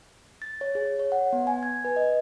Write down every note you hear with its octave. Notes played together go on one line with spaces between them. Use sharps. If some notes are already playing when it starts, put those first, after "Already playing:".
A6
C#5
G#4
C#5
F#5
B3
G#5
G#6
B4
D#5